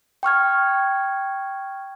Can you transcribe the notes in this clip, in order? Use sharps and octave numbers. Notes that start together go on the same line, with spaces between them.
G5 C#6 F6 G#6